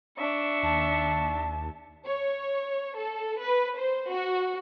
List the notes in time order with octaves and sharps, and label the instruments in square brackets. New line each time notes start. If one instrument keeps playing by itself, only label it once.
[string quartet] D4 E5 [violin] C#6
[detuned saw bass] D#2 [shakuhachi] A5
[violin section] C#5
A4
B4
C5
F#4